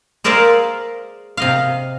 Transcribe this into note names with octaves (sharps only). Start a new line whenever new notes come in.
G#4 A#4 C5 D5 E5 F5
C3 D#5 F5